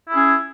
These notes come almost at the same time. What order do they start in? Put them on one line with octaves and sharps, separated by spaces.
E4 G#4 C#4